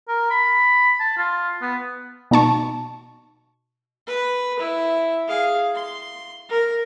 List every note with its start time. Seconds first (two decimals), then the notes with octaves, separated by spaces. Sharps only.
0.08 A#4
0.30 B5
1.00 A5
1.18 F4
1.62 B3
2.31 B2 D#4 A5 C#6
4.07 B4
4.59 E4
5.28 G#4 F5
5.75 C6
6.49 A#4